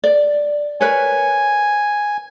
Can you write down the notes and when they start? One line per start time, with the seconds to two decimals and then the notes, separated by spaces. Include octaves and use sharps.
0.04 D5
0.81 A#4 B4 C#5 G#5